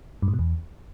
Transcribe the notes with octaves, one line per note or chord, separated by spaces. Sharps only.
G2
G#2
B2
E2